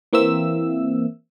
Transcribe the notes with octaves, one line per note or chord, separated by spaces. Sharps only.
E3 A#3 C4 E5 E6